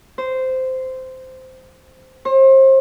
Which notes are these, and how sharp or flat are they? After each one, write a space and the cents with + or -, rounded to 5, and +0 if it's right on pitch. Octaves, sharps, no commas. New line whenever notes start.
C5 -10
C5 +35